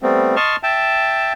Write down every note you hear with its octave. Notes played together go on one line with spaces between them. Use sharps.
G3 A3 B3 C4
D#5 A5 C6 C#6 F6
E5 G5 A5